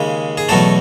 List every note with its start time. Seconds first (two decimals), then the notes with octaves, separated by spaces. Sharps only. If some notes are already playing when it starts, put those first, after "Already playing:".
Already playing: D#2 C#3 G#3
0.38 G#4
0.49 E2 B2 F#3 A3 A4